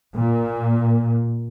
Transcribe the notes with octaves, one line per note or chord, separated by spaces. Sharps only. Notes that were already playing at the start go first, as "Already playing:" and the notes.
A#2